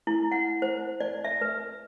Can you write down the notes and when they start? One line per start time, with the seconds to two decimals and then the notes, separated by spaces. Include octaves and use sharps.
0.07 E4
0.32 F#5
0.62 C5
1.00 D5
1.24 E5
1.41 B4